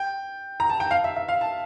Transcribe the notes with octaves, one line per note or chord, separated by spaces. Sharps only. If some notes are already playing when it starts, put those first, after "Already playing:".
Already playing: G5
A#5
A5
G5
F5
E5
E5
F5
A5